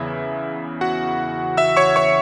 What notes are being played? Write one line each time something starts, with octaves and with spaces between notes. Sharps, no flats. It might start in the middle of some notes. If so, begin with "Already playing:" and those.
Already playing: E2 C#3 E3 B3 E4 E5
F#4 F#5
E5 E6
C#5 C#6
C#5 C#6